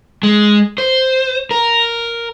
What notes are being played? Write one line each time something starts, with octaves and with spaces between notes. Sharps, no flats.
G#3
C5
A#4